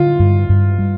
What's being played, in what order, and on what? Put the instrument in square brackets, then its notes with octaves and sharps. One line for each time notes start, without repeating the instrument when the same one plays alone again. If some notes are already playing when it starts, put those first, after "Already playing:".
Already playing: [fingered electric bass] D3 [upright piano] F4
[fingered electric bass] G2
G2
G3